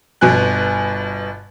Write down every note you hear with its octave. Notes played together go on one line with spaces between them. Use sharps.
G1 B2 G#5 F#6